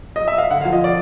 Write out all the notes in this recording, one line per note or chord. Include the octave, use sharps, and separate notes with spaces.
D#5
E5
F5
D3 F#5
F5
F3
D#5
D5